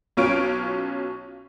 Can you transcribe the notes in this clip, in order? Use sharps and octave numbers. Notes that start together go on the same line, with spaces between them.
B1 C#4 F4 C#5 F6 D7